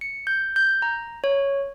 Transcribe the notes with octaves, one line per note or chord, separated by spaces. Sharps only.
C#7
G6
G6
A#5
C#5